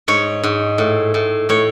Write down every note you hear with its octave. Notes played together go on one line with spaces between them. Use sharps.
G#2 C#5
G#2
A2
A2
A2 C#5